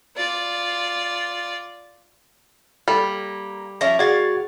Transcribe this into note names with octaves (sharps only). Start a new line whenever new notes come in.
F4 D5
G3 A#3 A4
F3 C#4 E4 A#6
F#4 G#4 D5 F5 G#6 A6